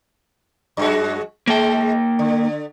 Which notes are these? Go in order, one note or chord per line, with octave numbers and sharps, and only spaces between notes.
F#2 G#3 F#4
G#3 A#3 G5
D3